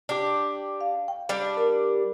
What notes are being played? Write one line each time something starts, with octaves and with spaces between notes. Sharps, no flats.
D4 G4
F5
G5
G3 D4
A#4 D5